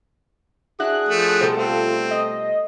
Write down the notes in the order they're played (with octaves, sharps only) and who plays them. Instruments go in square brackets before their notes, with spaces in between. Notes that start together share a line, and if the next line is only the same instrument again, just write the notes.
[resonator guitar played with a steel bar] D4 E4 F#4 [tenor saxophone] G#4 [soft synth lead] F#6
[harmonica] F3 A3
[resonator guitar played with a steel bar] B2 G3 A4 [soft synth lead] C5
[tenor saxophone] A3 [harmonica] C4 [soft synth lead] F4
[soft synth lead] D#5